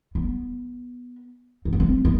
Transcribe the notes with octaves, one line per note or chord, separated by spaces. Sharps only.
B3
C4
B3
C4
B3